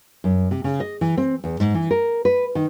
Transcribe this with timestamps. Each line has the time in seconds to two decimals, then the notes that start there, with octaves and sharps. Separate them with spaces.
0.24 F#2
0.51 C3
0.64 C#3
0.80 D#5
1.01 E3
1.17 C4
1.44 E2
1.60 G#2
1.74 E3
1.91 A#4
2.25 B4
2.55 D#3